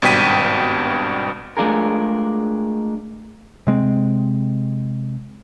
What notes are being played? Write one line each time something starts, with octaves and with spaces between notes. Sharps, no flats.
G#1 G2 B2 G5 B6 D#7
G#3 A3 D4 F4 G#4 A#4
C3 G#3 C4